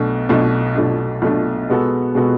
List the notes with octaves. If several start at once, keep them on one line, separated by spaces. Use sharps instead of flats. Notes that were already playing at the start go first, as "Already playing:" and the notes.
Already playing: B1 B2 A3 D4
B1 B2 A3 D4
B1 B2 A3 D4
B1 B2 A3 D4
B2 G#3 B3 F#4 A4
B2 G#3 B3 F#4 A4